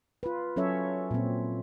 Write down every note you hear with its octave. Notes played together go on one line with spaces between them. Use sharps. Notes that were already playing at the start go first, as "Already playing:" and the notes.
F4 B4
F#3 C#4 A4 C#5 E5
A#2 C4